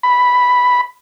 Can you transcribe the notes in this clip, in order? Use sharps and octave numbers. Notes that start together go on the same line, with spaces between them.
B5